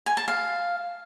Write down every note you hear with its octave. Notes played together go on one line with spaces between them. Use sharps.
G#5
A5
F5